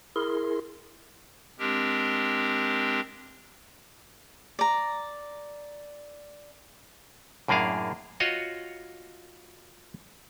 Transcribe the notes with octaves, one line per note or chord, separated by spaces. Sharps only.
E4 G#4 A#4 C6
G#3 C4 D4 G4 A#4
D5 A#5
F#2 A2 A#3 D4 G#4 F5
F4 F#4 C#5 D#5 F#5